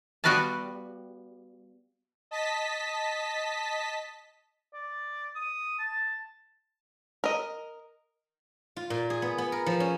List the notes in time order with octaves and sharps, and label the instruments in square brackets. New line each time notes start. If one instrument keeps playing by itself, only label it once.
[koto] G3 B3 F#4 B4 F5 A5
[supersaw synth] D#5 A5 B6
[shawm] D5
D#6
A5
[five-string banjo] A#4 D#5
[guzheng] F4
A#2
G#4
B3
B3
A#4
F3
C#4